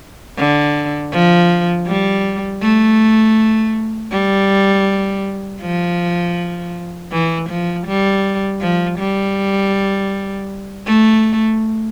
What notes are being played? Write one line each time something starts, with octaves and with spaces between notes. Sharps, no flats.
D3
F3
G3
A3
G3
F3
E3
F3
G3
F3
G3
A3